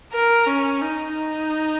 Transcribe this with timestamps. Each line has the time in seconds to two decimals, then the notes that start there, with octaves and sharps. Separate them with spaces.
0.13 A#4
0.47 C#4
0.81 D#4
1.15 D#4